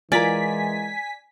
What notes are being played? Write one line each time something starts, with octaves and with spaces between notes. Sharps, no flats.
E3 G#3 F4 A#4 D5 G#5 B6